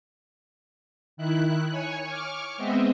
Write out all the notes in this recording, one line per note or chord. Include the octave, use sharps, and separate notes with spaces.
D#3 E4 F#6
C#5 G#5 C#6
C#6 D6 F6
G#3 B3 C4 D#5 E5